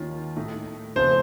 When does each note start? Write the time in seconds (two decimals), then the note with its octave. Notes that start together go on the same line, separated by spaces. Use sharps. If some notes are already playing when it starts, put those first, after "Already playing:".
Already playing: D#2 D#3 A#3 C#4 F4
0.36 A2 A3 D#4
0.96 F2 C#3 A3 D#4 C5